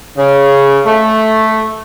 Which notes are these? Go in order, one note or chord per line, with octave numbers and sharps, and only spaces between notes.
C#3
A3